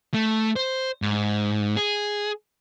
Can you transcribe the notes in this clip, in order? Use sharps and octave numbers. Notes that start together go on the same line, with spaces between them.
A3
C5
G#2
G#4